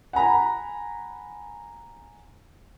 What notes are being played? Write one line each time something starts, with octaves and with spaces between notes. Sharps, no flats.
F#5 G#5 A#5 B5